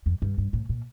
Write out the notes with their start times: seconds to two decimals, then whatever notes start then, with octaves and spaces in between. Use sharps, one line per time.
0.06 F2
0.22 G2
0.38 G2
0.53 A2
0.69 A#2